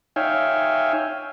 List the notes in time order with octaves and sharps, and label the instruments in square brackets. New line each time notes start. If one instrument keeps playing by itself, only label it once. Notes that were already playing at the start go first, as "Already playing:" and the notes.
[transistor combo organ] D#4 C#5 E5 F5 G5 G#5